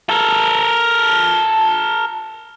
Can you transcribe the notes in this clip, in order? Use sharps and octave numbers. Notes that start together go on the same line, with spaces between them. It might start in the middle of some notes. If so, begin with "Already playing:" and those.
A4 A#4